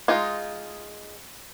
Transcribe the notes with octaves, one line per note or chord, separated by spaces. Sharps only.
G#3 D#4 F4